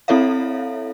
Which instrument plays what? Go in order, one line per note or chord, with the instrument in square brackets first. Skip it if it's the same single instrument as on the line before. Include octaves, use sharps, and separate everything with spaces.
[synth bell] C4 E4 A4 C#5 E5 F5